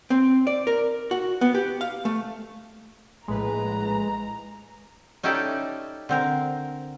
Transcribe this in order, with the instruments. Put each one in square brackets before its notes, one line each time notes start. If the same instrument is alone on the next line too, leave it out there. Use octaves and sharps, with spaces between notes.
[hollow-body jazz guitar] C4
D5
A#4
F#4
B3
G4
F5
A3
[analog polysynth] A#1 A2 B4 [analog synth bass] G#3 [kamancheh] A#5
[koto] C#4 D#4 E4 G4 A4 D5
D3 C4 A#4